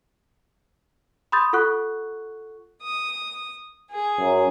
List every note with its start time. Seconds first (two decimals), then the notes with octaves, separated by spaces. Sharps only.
1.32 B5 C6 D#6 G6 A6
1.53 F4 A4 F#5 C#6 F#6
2.82 D#6
3.90 G#4
4.19 F#2